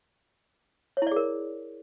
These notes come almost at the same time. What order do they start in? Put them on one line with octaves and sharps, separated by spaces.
C#5 E4 D5 G#4 A#4